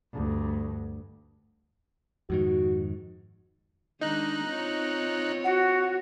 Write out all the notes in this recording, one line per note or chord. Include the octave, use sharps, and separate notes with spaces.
D2 G2
F2 G#2 D#3 F#4
D#3 G#3 D4 D#4 F#6
C4 F4 C#5
F#4 F#5